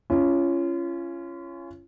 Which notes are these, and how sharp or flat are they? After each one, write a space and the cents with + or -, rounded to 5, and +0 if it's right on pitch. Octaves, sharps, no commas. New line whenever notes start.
C#4 +0 F4 -35